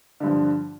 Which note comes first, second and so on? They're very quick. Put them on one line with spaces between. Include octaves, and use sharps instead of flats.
D3 G2 F3